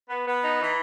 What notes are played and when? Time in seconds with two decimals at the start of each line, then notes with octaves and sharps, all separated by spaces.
0.10 B3
0.26 B3
0.43 D#4
0.60 E3